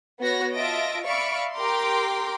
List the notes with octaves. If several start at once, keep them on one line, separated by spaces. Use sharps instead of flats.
B3 F#4 C#5 A#6
F4 D#5 E5 A5 A#6 D7
D5 E5 F5 B5 C#6 D7
G4 A#4 G5 A#5 C6 D6